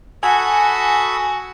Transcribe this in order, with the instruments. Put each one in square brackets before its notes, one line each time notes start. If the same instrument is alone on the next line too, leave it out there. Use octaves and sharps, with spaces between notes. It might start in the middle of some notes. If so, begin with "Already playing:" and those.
[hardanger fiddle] F#4 [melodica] A4 B5 D#6 [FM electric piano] G#5